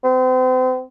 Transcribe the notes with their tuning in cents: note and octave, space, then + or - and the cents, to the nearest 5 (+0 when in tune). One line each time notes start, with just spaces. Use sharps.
C4 -40